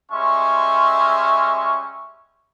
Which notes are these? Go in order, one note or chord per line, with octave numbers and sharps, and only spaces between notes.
G3 G#3 C#4 E5 C6 C#6